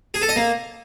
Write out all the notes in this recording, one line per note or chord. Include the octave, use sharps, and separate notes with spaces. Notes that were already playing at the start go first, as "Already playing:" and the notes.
G#4
A4
D#5
A#3